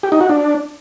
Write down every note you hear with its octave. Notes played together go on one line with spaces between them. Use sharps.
G4
D#4
F#4
D4